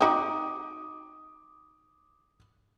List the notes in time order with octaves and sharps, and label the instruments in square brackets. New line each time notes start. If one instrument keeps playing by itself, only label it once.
[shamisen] C4 D#4 F#4 [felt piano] D6 D#6